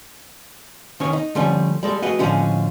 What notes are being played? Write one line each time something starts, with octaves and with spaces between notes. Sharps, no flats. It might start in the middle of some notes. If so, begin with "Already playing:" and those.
D#3 C#4 C#5
D#4
D3 F3 G3 A3 C#4
G3 G#3 A4
A3 F#4 G#4 B4 D#5
A2 D3 F3 G#3 C#4